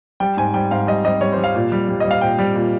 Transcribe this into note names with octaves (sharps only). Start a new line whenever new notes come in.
G3 G5
G#2 G#5
G3 G5
G#2 F5
G3 D#5
G3 D#5
G3 C#5
C5
G3
F5
A#2
G3
G3
G3 D#5
F5
A#2 G5
G3
A#2